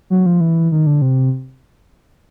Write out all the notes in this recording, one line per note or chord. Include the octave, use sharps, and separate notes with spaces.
F#3
F3
E3
D#3
D3
C3